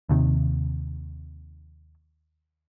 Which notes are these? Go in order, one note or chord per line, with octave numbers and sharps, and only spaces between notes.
D#2 C3 D#3